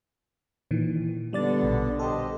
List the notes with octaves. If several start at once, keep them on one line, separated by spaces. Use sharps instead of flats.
A#2 D#3 E3
D3 G3 B3 D4 D5 A6
A#1 B2
G4 A4 C5 D#5